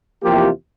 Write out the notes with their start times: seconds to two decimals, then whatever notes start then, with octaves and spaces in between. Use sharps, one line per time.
0.22 E2 C3 F3 A#3 F4 G4